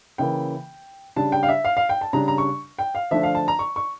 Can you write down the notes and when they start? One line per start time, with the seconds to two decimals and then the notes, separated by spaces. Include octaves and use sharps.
0.18 C#3 E3 A#3 G5
1.16 C#3 G3 D4 A5
1.32 G5
1.43 F5
1.49 E5
1.65 F5
1.77 F5
1.89 G5
2.01 A5
2.13 C#3 G3 D4 A#5
2.28 A#5
2.38 C#6
2.79 G5
2.95 F5
3.11 D3 F3 A3 D4 E5
3.23 F5
3.35 A5
3.48 A#5
3.59 C#6
3.76 C#6